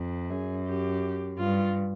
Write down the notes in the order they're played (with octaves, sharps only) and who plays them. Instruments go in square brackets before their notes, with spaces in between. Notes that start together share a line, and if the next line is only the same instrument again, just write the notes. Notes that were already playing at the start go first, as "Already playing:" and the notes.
Already playing: [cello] F2
[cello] F#2 [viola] G#4
[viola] G4
[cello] G2 [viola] F4